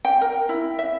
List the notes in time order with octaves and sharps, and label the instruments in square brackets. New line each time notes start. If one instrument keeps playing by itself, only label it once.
[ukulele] G5
A#4
E4
E5